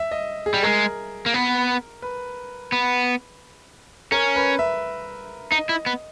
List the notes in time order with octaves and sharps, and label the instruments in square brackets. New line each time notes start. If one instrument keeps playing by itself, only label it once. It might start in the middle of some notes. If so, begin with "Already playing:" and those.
Already playing: [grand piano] E5
D#5
G#4
[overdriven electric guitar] G3
[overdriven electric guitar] G#3 [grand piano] A#4
[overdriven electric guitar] A#3
B3
[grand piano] B4
[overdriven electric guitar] B3
[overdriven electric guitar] C#4 [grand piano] A#4
[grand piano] B4
E5
[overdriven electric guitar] D#4 [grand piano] D#5
[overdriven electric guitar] E4
B3